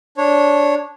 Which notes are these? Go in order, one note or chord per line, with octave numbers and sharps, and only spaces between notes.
D4 C#5